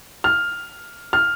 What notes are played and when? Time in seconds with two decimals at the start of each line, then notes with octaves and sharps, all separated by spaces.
0.24 F6
1.13 F6